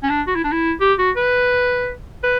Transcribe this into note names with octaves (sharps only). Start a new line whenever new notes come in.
C#4
D4
F#4
E4
D4
E4
G4
F#4
B4
B4